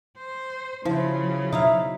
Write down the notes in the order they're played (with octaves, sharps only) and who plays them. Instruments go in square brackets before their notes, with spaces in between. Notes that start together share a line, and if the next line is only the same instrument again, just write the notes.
[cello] C5
[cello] C#3 F#3 [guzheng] F3 [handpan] E4
[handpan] B2 E5 [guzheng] D#4 E4 F5